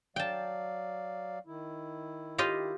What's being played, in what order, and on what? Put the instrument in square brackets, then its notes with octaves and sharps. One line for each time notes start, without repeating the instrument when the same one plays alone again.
[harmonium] F#3 D5 F5 [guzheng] G5 A5
[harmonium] D#3 E4
[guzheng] F4 G4 D#5